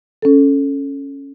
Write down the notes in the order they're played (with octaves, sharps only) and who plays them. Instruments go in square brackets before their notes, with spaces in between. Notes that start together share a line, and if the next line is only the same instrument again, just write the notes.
[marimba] C#4 A4